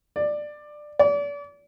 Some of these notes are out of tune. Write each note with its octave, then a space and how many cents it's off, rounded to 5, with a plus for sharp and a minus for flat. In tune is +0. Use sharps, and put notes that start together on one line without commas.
D5 +15
D5 -35